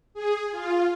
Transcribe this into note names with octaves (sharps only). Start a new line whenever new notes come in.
G#4
F4